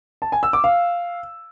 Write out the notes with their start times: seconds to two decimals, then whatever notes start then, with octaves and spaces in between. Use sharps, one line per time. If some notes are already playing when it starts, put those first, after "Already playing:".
0.22 A5
0.32 G#5
0.43 E6
0.53 D6
0.64 F5